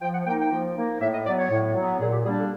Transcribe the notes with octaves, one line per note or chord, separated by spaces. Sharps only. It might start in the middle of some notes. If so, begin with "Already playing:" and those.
F3 G5
F#5
A#3 D#4 G5
G5
F3
A#3 D#4
A2 E5
D#5
F#3 B3 D5
C#5
A2
F#3 B3
A#2 G#4
G4
G3 A#3 D4 G#4
A4